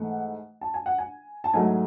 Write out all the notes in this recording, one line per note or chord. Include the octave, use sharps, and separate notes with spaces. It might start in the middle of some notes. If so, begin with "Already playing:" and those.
Already playing: G#2 E3 A3 F#5
A5
G#5
F#5
G#5
A5
G#2 F#3 A3 G#5